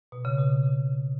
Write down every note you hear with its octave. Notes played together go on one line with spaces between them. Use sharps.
B2
C#3
B2